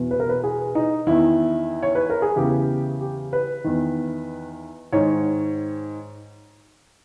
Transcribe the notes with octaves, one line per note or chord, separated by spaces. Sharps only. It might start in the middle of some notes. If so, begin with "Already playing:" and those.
Already playing: E2 B2
B4
A#4
B4
G#4
D#4
E2 D#3 E4
C#5
B4
A#4
G#4
E2 C#3 E3 G4
G4
B4
E2 D#3
G#2 D#3 C#5